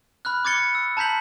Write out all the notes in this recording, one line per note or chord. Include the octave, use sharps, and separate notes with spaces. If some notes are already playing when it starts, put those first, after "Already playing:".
B5 F6 F#6
D6 G#6 A6 C#7 G7
E6
A5 A#5 G6 B6 F#7